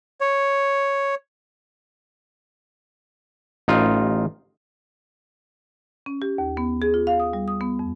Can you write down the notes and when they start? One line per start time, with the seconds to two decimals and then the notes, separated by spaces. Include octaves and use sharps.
0.21 C#5
3.68 A1 D#4 F4
6.06 C#4
6.22 G4
6.38 D#2
6.57 B3
6.82 G#4
6.94 F4
7.07 F5
7.20 D#6
7.33 G3
7.48 D#6
7.61 B3
7.79 F2